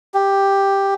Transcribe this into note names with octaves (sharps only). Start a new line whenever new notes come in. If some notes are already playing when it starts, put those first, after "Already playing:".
G4